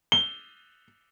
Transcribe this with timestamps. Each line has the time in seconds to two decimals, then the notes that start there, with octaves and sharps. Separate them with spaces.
0.12 G7